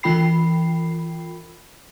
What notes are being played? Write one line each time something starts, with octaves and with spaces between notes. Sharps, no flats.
E3 F4 G5 B5 C7